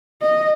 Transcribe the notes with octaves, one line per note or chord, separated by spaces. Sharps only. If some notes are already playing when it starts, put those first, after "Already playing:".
D#5